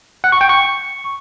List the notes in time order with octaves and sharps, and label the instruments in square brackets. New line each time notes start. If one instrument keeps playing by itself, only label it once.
[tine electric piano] F#5
C#6
G5
C#6